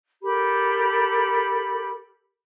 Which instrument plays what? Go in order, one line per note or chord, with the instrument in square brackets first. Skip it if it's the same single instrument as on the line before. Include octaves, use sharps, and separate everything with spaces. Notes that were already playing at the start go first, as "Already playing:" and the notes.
[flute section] G4 A4 A#4 B5